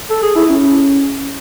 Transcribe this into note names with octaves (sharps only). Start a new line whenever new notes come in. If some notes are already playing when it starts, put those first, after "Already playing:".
A4
G#4
E4
C#4